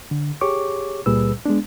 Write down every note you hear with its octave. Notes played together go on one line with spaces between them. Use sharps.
D3
G4 G#4 C#5 C#6 D6
C#2 A#2 G3 G#4 B4 E6
G#3 B3 D4